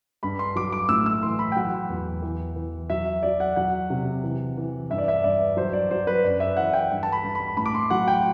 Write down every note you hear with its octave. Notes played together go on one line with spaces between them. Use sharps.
G2 B5
C6
F#3 D6
D6
A2 E6
E6
E3 C6
B5
G5
F#3 F#5
E2
E3
E3
F#3 E5
F#3 D5
F#5
F#3 F#5
C3
E3
E3
G2 E5
D5
E5
G2 D5
F#3 C5
D5
F#3 C5
B4
F#2 D5
E5
E3 F#5
G5
G2
A5
B5
G2
B5
A2 B5
D6
C6
F#3 F#5
G5